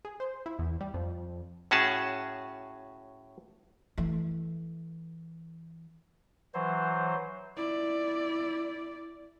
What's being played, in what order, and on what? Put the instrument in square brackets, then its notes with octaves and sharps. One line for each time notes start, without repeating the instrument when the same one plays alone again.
[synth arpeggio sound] G#4
C5
E4
E2
G3
F2
[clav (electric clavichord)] A2 C#4 F#4 G#4 A5
[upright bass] E3 A3
[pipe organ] E3 F#3 C5
[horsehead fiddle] E4 D5